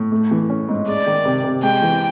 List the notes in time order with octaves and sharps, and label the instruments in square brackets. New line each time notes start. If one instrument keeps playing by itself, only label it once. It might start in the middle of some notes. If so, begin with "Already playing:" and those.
Already playing: [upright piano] A2
A3
E3
C#4
G#2
[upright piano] G#3 [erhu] D5
[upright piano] D#3
C3
C3
[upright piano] G#3 [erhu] G5
[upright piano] E3